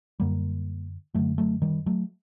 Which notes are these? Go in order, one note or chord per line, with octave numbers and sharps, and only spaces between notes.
F#2 D3 G3 A#3
F#2 D3 F#3 A3
F#3 A3
D#3 G3
F#3 A3